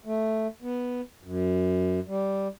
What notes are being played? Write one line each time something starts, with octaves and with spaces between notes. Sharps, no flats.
A3
B3
F#2
G3